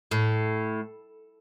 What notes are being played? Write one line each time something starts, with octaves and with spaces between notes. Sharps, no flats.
A2